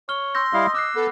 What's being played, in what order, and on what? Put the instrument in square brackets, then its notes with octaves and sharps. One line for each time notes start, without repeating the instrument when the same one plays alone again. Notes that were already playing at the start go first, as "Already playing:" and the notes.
[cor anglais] C#5 [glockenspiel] F6 G7
[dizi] C6 [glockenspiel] E6 G6 A#6
[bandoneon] G3 E4 F5 [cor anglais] D#5
[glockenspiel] D6 F#6 C7 [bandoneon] E6
[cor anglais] B3 [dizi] A4